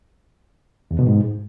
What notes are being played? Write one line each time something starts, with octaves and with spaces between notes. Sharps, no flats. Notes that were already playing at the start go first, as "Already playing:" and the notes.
E2
B2
G#2